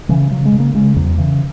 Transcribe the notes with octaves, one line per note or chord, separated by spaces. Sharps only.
C#3 E3
C#3 F#3
G#3
C#3
A#3
C#3 G#3
E2 F#3
C#3 E3